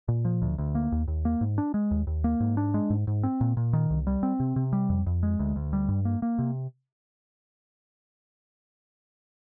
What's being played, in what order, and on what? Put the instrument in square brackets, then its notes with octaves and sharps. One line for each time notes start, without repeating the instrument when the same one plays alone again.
[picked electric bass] A#2
F3
D2
D2
A#3
D#2
D#2
A#3
G#2
D4
G#3
D#2
D#2
A#3
G#2
D4
G#3
G#2
G#2
C4
A#2
A#2
D#3
C2
G3
C4
C3
C3
G3
F2
F2
G#3
D2
D2
G3
G2
A#3
A#3
C3